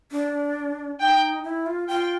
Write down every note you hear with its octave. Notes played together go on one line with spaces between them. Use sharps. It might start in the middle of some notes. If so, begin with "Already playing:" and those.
D4
D#4 G5
E4
F4
F4 G5